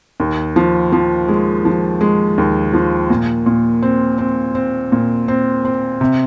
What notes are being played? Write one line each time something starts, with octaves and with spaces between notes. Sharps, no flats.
D#2
F3
F3
G#3
F3
G#3
D#2
F3
A#2
A#2
C4
C4
C4
A#2
C4
C4
C3